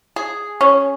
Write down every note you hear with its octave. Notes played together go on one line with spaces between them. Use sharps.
G#4
C#4